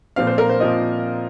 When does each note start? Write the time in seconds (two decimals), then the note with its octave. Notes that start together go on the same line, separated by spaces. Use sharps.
0.16 A#2 F3 C4 F5
0.27 C5
0.38 A#4
0.49 C5
0.60 A#2 F3 C4 D#5